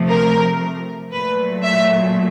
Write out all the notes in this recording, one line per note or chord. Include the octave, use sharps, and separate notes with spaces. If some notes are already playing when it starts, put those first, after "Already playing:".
Already playing: C3 F3 A3
A#4
A#2 F#3 A3 B4
E5